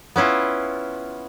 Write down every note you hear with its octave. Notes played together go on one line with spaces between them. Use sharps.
B3 C#4 E4 F4